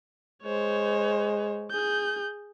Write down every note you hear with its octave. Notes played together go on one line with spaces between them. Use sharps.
G#3 C5 C#5
G#4 G6